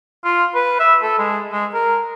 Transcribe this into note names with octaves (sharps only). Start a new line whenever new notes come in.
F4
B4
E5
A4
G#3
G#3
A#4